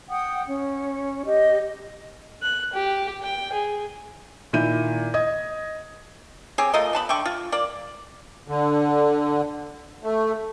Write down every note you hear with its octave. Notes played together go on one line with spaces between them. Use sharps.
F#5 G5 D#6
C#4
G4 D#5
F#6
G4
G5
G#4
A#2 D#3 E4 G6 D#7
D#5 D#6 G#6
C4 G4 G#4 C#5
A3 F4 A#4 D#5
B3 A5 B5
D3 E5 G5 C#6
F4
A#3 D5
D3
A3